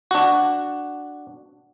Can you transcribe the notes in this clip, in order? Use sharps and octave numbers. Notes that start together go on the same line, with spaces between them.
D4 F#4